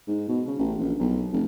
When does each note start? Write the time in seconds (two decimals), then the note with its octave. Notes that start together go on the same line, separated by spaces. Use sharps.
0.08 G#2
0.28 B2
0.47 C#3
0.59 A1
0.79 A#1
1.00 B1
1.33 F1